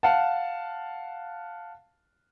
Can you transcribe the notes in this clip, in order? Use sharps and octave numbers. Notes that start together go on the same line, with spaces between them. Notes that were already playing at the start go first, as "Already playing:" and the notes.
F5 F#5 A5